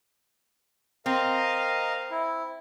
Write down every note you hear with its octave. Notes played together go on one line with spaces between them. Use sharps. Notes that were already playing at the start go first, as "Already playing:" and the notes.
C4 A#4 D#5 F5
E4